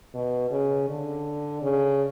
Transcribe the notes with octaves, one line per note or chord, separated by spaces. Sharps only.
B2
C#3
D3
C#3